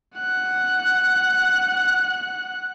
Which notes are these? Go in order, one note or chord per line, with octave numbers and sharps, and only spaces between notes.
F#5 F#6